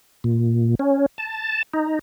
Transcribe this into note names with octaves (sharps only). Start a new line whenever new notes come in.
A#2
C#4
A5
D#4